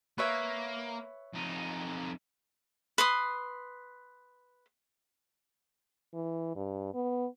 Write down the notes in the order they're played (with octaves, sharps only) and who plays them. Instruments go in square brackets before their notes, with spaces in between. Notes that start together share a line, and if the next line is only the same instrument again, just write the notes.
[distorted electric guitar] A#3 [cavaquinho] B4 C#5 E5
[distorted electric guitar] F2 D#4
[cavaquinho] B4 C6 D#6
[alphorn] E3
G2
B3